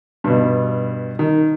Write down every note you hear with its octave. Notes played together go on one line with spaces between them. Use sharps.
G2 B2
D#3